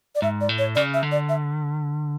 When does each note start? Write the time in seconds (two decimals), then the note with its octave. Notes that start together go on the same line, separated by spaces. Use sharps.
0.15 D5
0.22 G#2 E5
0.41 D5
0.49 A2
0.58 C#5
0.75 C#3 D5
0.94 E5
1.03 D3
1.12 D5
1.29 E5